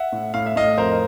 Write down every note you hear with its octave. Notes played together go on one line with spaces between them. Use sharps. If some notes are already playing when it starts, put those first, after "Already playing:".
Already playing: E5 F#5
A2
A2 F5
E5
A2 D#5 F5
F2 A#4 C5